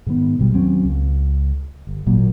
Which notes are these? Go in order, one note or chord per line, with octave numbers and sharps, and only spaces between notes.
G#2 D#3 B3
A1 B2 G3
D#2 F#3 C4 C#4
C#2
G1
G#1 A#2 F#3 A#3